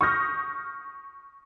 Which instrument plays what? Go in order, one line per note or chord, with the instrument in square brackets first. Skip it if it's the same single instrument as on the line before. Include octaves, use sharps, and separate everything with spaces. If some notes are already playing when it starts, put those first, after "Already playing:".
[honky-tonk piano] C#6 D#6 F6 G6 A#6